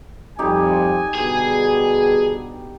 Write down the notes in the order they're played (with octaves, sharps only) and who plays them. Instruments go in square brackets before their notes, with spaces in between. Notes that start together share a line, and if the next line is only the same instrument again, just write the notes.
[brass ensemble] F2 G3 [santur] D#4 G4 [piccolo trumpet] G#5
[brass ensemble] B2 D3 G3 [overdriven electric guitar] G#4